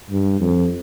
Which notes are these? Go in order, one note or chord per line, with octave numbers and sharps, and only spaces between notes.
G2
F2